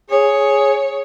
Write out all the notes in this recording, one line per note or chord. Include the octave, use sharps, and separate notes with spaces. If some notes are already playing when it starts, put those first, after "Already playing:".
G#4 C#5